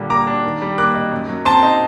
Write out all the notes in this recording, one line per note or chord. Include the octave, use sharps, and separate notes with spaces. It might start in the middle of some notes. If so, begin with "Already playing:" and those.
Already playing: A#2 D3 G3
A#3 A#5 D6
D4
D#3
G3
A#3 D6 F#6
D#4
F#2
F#3
C4 A5 C6
D#4